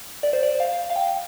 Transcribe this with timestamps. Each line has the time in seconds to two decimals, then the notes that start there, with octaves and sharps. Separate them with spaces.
0.23 D5
0.33 C5
0.43 D5
0.60 F5
0.90 F5
0.96 G5